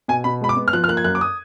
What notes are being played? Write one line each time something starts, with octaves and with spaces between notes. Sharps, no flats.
B2 G#5
B2 B5
G#3 B5
D6
B3
F6
F3 F#6
F6
A#3 F#6
G#6
F#2 F#6
D6
D#6